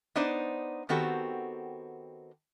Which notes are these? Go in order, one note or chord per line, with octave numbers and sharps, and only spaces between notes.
B3 D4 D#4 C5 D5
D#3 B3 C4 F#4 G4 A4